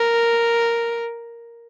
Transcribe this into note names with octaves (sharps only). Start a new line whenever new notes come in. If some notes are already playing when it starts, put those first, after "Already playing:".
Already playing: A#4